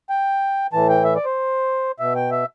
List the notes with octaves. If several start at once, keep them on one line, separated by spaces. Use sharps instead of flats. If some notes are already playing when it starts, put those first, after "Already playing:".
G5
A2 E3 A5
G5
E5
D5
C5
B2 E5
G5
E5